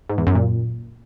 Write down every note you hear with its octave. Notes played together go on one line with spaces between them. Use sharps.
G#2
E2
F#2
A#2